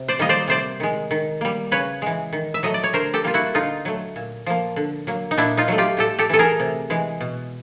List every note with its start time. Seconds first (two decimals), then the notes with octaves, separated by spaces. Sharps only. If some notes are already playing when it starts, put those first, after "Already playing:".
Already playing: C3
0.08 C5 D5
0.19 D#3 G3 A#3 D#5
0.29 C5 D5
0.48 C3 C5 D5
0.80 D#3 G#3
1.11 D#3
1.41 G3 A#3
1.71 C#3 B4 C#5
2.02 E3 G#3
2.33 D#3
2.54 E5
2.63 F#3 A3 D#5
2.74 D5
2.84 C#5
2.93 D3 A#4 C5
3.14 G4 A4
3.24 G3 A#3 F4
3.34 E4 F#4
3.54 D3 D#4 F4
3.85 F#3 A3
4.16 A#2
4.46 F3 A#3
4.76 D3
5.07 F#3 A#3
5.31 D#4
5.37 A#2 D4 E4
5.57 D#4 F4
5.68 F#3 A3
5.78 F4 G4
5.97 A2 G4 A4
6.19 G4 A4
6.30 E3 A3 A4
6.39 G#4 A#4
6.60 C3
6.90 E3 G#3
7.21 B2